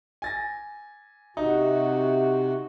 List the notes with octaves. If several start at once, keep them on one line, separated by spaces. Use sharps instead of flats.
G#5 A6 A#6
C3 D#4 F#4